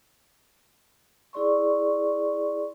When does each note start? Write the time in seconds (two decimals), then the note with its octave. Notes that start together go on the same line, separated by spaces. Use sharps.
1.33 E4 G#4 D5 C6 C#6